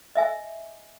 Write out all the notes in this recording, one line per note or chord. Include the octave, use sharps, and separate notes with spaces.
D#5 E5 G#5